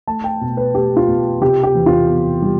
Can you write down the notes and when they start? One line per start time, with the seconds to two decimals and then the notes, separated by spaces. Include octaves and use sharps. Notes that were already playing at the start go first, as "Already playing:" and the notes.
0.07 A3 A5
0.24 G5
0.41 B2
0.57 B4
0.74 A3 G4
0.97 F4
1.08 B2
1.41 C3 G4
1.63 G4
1.75 E2
1.86 F4
2.09 B3
2.42 G3